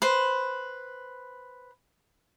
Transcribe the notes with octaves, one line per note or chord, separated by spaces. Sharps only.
B4 C5